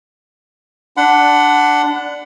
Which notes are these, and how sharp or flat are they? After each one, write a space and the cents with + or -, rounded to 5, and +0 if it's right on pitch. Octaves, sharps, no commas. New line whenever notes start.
D4 +0 F#5 +5 B5 +45